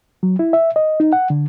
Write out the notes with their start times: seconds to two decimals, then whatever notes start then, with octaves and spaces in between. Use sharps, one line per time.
0.23 F#3
0.39 E4
0.53 E5
0.76 D#5
1.00 D#4
1.13 F#5
1.30 D3